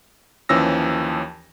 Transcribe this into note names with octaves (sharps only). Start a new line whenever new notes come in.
D#2 E3 F3 C#4 E6 A#6